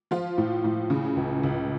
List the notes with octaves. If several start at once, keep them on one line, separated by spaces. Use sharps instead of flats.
F3 F4
A2
A2
C#3
C#2
C#2